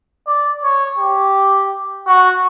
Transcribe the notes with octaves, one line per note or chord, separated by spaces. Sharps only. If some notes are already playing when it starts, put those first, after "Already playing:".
D5
C#5
G4
F#4